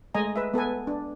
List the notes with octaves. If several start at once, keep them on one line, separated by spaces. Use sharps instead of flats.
G#3 A3 D#5 G#5 A#5
B4 E5
B3 A4 B4 G#5
D4